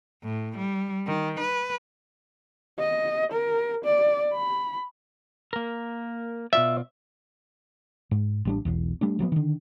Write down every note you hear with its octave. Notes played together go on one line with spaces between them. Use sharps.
A2
G3
D#3
B4
D#5
A#4
D5
B5
A#3 A#4
B2 F4 D5 E5
G#2
A1 G3 D4
E1 B1 E2
G3 A3 D4
F3 F#3 A#3 B3
D3 D#3